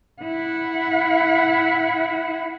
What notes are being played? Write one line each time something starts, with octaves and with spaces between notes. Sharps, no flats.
E4 F#5